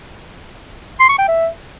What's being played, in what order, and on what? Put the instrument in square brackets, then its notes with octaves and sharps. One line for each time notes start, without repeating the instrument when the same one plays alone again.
[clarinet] C6
C#6
G5
E5